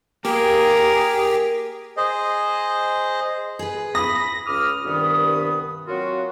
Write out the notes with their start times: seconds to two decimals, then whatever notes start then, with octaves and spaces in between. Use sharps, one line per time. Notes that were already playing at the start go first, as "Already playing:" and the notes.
0.25 A#3 G4 G#4 A#4
1.97 G#4 C5 D#5
3.59 G#4 B4
3.95 B5 D#6 A#6
4.46 C#2 D6 D#6 F6
4.85 C2 G2 D#3 B3 D#6
5.88 F#3 A#3 C4 F4 F#4